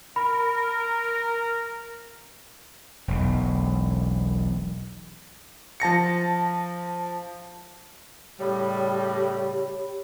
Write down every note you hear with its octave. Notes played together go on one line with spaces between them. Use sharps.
A#4 B5
E1 B1
F3 A5 A#6 C#7
A2 C#3 G3 G4 C#5 B5